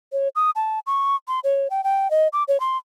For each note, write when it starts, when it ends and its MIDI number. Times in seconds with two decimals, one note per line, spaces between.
0.13 0.28 73
0.35 0.50 87
0.56 0.79 81
0.87 1.16 85
1.28 1.40 84
1.44 1.68 73
1.70 1.84 79
1.84 2.10 79
2.11 2.28 75
2.33 2.43 86
2.48 2.60 73
2.60 2.77 84